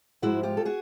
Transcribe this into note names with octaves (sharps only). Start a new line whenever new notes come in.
G#2 F3 G#3 E4 F#4
F4 G4
A4
F#4 G#4